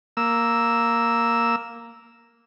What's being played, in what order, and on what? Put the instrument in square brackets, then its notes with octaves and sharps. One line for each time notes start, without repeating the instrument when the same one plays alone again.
[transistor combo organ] A#3 E6